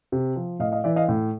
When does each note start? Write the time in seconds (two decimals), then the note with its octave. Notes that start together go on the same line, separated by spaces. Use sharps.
0.12 C3
0.36 F3
0.60 A2 D#5 F5
0.72 D#5 F5
0.84 E3 D5 E5
0.96 D#5 F5
1.09 A2